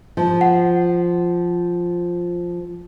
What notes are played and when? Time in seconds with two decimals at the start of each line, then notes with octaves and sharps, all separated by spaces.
0.17 F3
0.41 F#5